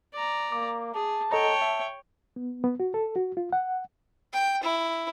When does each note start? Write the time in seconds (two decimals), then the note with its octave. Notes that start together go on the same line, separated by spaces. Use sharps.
0.13 D5 A#5
0.52 A#3 D6
0.94 G#4 A5
1.32 A4 C#5 D#5 G5 A#5
1.62 E5
2.36 B3
2.64 B3
2.80 F#4
2.94 A4
3.16 F#4
3.37 F4
3.53 F#5
4.33 G5
4.63 E4